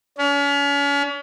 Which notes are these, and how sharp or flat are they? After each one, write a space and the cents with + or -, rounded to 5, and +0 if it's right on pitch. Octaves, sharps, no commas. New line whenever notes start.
C#4 +40